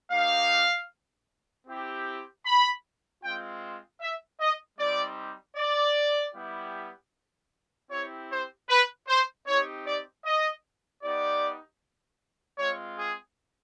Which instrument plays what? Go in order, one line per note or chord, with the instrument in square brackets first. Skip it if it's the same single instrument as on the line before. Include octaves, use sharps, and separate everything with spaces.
[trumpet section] A#3 D#4 G4 F5
C4 E4 G4
B5
G#3 C4 F4 G5
E5
D#5
G3 C4 D#4 G4 D5
D5
G3 B3 E4 G4
C4 E4 G4 C#5
C5
B4
C5
C4 D#4 G4 C#5
D5
D#5
B3 D#4 G4 D5
G#3 C4 F4 C#5
G#4